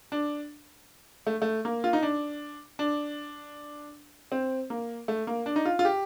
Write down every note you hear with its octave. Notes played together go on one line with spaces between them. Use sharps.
D4
A3
A3
A#3
F4
D#4
D4
D4
C4
A#3
A3
A#3
D4
D#4
F4
F4
G4